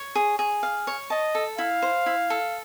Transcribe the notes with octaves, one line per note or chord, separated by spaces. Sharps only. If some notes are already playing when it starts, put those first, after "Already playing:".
Already playing: C#5
G#4
G#4
F5
C#5
D#5 A5
A4
E4 F5
C5
E4
A4